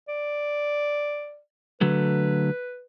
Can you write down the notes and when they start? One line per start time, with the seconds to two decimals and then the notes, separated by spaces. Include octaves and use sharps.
0.08 D5
1.81 D3 F#3 A3 B4